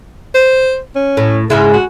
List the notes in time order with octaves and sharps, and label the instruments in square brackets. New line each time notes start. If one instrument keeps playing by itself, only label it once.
[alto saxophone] C5
C#4
[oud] A2
[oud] G#2 C#3 G#3 [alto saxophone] E4
[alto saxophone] F#4